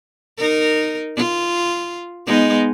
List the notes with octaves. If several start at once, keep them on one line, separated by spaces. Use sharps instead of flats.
D#4 A#4
F4
G#3 B3 D#4